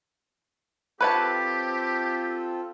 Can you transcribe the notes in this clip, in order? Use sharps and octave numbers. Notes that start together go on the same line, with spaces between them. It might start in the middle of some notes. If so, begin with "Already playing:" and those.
C4 F4 G4 A4 B4 C#5 A5